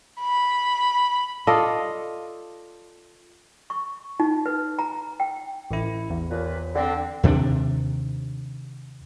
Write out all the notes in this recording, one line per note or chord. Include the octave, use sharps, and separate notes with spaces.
B5
F4 A4 D5 D#5
C#6
D#4
B4
A#5
G5
A1 E4
E2
D#2 A#2 B4
D3 C4
D#2 C3 G3 D4